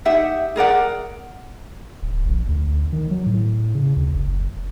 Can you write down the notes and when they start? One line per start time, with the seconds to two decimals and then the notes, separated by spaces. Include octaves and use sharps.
0.05 D#4 G4 E5 F#5
0.56 G#4 A#4 D5 F#5
2.02 D1
2.25 A#1
2.49 D2
2.92 D#3
3.11 F#3
3.26 A2
3.75 C#3
3.97 D2
4.15 F#1